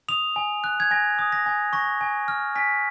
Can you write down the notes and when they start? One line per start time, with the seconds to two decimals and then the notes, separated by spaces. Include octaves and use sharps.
0.08 D#6 F7
0.36 G#5
0.64 F#6
0.80 G#6
0.91 G#5 A#6
1.19 D#6
1.32 A#6
1.46 G#5
1.73 C#6 A#6
2.01 G#5
2.28 F6
2.55 G#5 B6